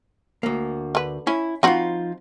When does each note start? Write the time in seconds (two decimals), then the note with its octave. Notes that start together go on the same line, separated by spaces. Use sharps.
0.43 D2 A#3
0.95 D3 B4
1.27 C#4 E4
1.63 F3 C4 D#4 F4 F#4 B5